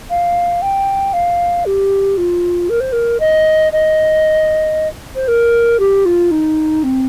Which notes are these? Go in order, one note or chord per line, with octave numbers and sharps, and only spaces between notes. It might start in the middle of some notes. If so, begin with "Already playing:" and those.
F5
G5
F5
G4
F4
A#4
C5
A#4
D#5
D#5
C5
A#4
G4
F4
D#4
C4